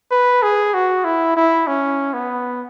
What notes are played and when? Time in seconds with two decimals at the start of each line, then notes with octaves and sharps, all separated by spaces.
0.11 B4
0.43 G#4
0.74 F#4
1.05 E4
1.37 E4
1.67 C#4
2.13 B3